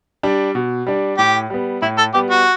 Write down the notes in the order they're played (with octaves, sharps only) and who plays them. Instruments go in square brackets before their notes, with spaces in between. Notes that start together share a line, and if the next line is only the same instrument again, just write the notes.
[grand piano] G3 D4
B2
G3 D4
[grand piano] A2 [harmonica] G4
[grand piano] G3 B3
[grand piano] A2 [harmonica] E4
[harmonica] A4
[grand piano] G3 B3 [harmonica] G4
[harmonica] F#4